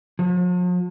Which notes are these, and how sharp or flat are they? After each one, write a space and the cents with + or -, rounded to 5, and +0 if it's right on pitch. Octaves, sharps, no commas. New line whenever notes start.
F3 +45